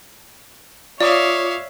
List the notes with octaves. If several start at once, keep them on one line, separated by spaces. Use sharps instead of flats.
F4 C#5 D5 E5 F5 D6 D#6